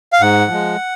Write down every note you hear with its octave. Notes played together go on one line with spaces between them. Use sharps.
F5
G#2 F#5
F3 G#3